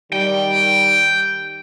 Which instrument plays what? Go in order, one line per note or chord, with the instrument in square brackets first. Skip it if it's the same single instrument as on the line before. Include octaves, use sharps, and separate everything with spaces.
[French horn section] D#3 G3 [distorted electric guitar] G5